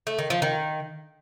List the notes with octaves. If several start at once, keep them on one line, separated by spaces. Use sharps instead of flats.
A3
D#3
F3
D#3